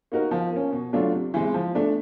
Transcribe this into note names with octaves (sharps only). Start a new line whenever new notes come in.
A#3 D#4 F#4 A#4
F3
A#3 C#4
B2
F#3 A3 D4 F4
C3
E3 G#3 C4
F3
A3 D4